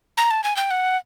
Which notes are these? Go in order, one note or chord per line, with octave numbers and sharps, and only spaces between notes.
A#5
A5
G#5
G5
F#5